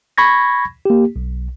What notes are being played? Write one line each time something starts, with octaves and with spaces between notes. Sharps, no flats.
B5 C#6 G#6 A#6
A#3 G4
B1